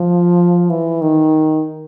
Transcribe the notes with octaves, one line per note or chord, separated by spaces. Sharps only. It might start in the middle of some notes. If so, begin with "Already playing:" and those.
Already playing: F3
E3
D#3